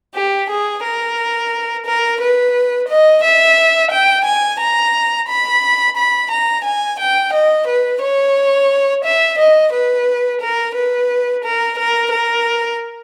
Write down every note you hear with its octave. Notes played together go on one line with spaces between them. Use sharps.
G4
G#4
A#4
A#4
B4
D#5
E5
G5
G#5
A#5
B5
B5
A#5
G#5
G5
D#5
B4
C#5
E5
D#5
B4
A#4
B4
A#4
A#4
A#4